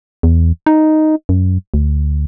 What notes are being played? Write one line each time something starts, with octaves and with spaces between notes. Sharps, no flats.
E2
D#4
F#2
D2